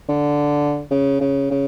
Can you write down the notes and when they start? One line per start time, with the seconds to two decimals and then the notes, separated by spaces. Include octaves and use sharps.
0.09 D3
0.91 C#3
1.20 C#3
1.51 C#3